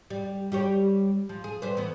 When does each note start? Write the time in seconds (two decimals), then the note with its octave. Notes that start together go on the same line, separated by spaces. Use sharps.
0.10 G3
0.52 G3 G4 C#5
1.29 F3
1.44 G#4
1.62 G3 B4 C5
1.77 E3 B3